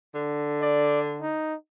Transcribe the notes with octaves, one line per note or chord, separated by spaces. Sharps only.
D3
D5
D#4